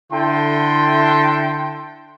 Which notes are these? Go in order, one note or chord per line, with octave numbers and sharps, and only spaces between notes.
D3 E4 A4 G5 A5 C6